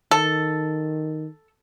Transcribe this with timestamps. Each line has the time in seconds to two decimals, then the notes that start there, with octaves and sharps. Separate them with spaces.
0.11 D#3 A4